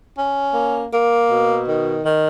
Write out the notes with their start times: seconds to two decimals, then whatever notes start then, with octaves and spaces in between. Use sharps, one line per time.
0.16 C#4
0.54 A#3
0.91 A#3
1.30 B2
1.67 D#3
2.04 D#3